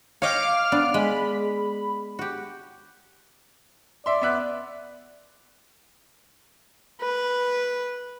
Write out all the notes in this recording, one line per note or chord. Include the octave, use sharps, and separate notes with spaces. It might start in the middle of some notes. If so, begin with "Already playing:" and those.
C#5 D#5 F5 G5 D6 F6
B3 D4
G#3 B5
F#4 G4
D5 E5 C6
B3 E5 F#6
B4